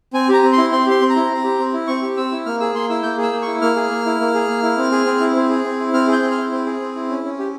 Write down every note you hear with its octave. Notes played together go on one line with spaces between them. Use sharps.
C4 G#5
G4 A#5
C4
C6
E4
C4 C6
G4 C6
C4
A#5
E4
C4
G4
C4
E4
C4 C#6
G4
C4 E6
E4
A#3 F6
G#4 E6
A#3 C6
E4 E6
A#3 G6
G#4
E6
A#3
E4 C#6
A#3 F6
G#4
A#3
E4
A#3
G#4
A#3
E4
C4
G#4
C4
E4
C4
G#4
C4
E4
C4 F6
G#4
G6
C4
F6
E4
C4
G#4
C4
E4
C#4
C#4
G4